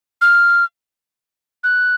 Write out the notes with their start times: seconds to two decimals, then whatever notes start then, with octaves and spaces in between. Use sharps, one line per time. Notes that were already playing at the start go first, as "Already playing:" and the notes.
0.22 F6
1.64 F#6